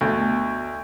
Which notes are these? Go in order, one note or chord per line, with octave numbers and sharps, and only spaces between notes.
D2 B2